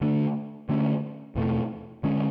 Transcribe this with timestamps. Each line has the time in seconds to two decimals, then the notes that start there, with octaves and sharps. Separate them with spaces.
0.01 D3 A3 D4
0.69 D3 A3 C#4
1.35 E2 B2 A3
2.03 D3 G#3 C#4